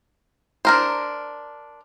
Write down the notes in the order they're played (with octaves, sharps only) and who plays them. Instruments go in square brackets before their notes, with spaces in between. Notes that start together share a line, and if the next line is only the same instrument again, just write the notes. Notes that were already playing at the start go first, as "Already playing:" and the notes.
[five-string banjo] D4 A#4 C5